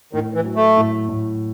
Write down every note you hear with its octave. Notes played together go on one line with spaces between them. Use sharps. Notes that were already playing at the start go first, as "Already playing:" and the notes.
A2 D#3
E3
F#3
A3
A2
A2